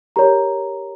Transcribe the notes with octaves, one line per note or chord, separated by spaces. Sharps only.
G4 A#4 C#5 A#5